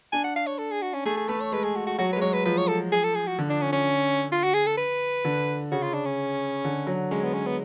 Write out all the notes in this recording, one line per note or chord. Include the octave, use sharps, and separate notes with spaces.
D4 G#5
F#5
F5
C#5
A4
G#4
F#4
C#4
A3 G#4
G#4
A3 B4
C#5
G#3 B4
G#4
F#4
F#4
F#3 F#4
G#3 B4
F#3 C#5
B4
F3 B4
C#5
A4
G#4
A4
G#4
F#4
D3
D4
C#4
C#4
F4
F#4
G#4
A4
B4
D3
C#3 F#4
F4
D4
C#4
D3
F#3
G#3 C#4
B3
C#4
B3